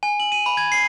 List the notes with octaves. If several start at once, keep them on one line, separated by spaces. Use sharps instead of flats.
G#5
F#7
D#7
B5
G#6
C7